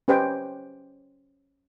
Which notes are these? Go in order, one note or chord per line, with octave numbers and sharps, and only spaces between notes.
C#4 G4 B4 C5 D#5 G5